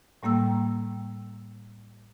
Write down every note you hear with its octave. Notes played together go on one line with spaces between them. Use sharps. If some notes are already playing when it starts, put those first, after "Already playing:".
A2 G3 A#3 G5 E6